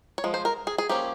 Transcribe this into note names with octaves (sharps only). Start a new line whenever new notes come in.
C#5
F3 G#3
C5
A#4
G#4
G#4
F3 A#3 C#4 G4